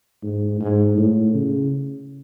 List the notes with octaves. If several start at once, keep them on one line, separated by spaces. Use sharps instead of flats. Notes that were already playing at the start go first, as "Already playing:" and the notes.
G#2
G#2
A2
C#3